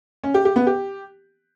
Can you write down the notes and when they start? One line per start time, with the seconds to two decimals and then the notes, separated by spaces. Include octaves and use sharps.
0.24 C#4
0.34 G4
0.45 G4
0.56 B3
0.67 G4